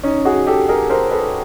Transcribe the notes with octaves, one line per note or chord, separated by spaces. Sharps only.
C#4 D#4
F#4 G#4
G4 A4
G#4 A#4
A#4 C5
A4 B4